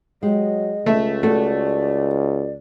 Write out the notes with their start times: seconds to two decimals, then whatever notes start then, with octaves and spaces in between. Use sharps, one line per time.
0.23 F#3 G#3 G4 D#5
0.86 C#2 A3 E5
1.23 A3 F#4 A4 D5